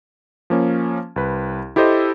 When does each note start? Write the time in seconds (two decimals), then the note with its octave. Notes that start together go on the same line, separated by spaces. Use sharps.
0.50 F3 A#3 C#4
1.16 C2 B4
1.76 E4 G4 A4 C5 D#5